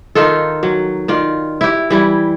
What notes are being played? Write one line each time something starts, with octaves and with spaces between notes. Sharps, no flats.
D#3 D#4 F4 A4
F#3
D#3 F4 D5
E4 G4
E3 G3 E4